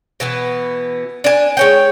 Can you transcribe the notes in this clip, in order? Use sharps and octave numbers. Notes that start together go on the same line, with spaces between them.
B2 E3 B3
D4 G#5
G#3 C#5 G5